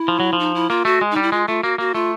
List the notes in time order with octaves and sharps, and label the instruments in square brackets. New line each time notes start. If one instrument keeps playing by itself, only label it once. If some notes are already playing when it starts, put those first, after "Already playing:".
Already playing: [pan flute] E4
[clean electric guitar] F3
F#3
F3
[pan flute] D#4
E4
[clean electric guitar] A#3 [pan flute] F4
[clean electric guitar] A3 [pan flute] F#4
[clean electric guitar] G#3
[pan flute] D#4
[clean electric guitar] G3
[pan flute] E4
[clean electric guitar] G#3 [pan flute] F4
[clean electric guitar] A3 [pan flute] F4
[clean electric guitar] A#3 [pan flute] F#4
[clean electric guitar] A#3 [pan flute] F#4
[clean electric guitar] A3 [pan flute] F4